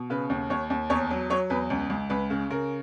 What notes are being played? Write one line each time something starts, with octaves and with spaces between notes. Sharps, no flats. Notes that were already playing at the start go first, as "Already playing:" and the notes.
Already playing: B2
C#3 B4
D#2
D#2 C#5
D#2
E2 C#5
F#3
F#3 C#5
E2 B4
C#2
C#2
C#2 B4
C#3
C#3 A#4